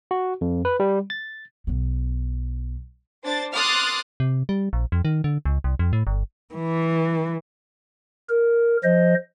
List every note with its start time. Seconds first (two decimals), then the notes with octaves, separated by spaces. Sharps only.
0.11 F#4
0.41 F2
0.65 B4
0.80 G3
1.10 A6
1.67 B1 B3
3.24 D4 C5 A6
3.54 C6 D6 D#6 F6 F#6 A6
4.20 C3
4.49 G3
4.73 A#1
4.92 F2
5.05 D#3
5.24 D3
5.45 C#2
5.64 C2
5.79 F2
5.93 A2
6.07 G1
6.54 E3
8.30 A#4
8.84 F3 C5 D#5